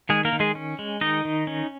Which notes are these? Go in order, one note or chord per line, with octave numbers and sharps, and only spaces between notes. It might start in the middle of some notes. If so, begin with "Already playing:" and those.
D#3 G#3 G#4
A#3 A#4
D#3
G#3 G#4
C#4
G#3
D#3 D#4 D#5
D#3
C#4